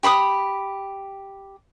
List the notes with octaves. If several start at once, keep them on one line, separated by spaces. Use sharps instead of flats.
G4 B5 C6 D#6